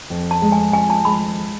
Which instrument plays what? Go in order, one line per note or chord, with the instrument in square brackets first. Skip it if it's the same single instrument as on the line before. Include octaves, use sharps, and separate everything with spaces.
[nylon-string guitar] F2
[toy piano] A5
[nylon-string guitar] G#3
[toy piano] G#5
[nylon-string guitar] F2 [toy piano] G#5
[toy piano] A5
[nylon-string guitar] G#3 [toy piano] B5